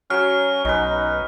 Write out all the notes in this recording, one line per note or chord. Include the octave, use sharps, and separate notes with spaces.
F#3 C#4 C#5 F6
B1 C#4 D#4 B4